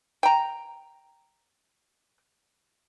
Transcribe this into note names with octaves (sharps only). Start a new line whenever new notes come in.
G5 A#5